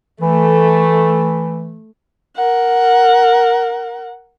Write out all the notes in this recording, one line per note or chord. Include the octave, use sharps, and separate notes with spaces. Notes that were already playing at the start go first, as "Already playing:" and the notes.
E3 A3
A#4 F#5